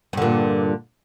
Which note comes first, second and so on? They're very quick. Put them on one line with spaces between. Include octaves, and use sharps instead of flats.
G2 D3 A#2